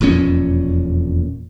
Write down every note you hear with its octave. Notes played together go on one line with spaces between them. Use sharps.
E1 F2 A#2 C#4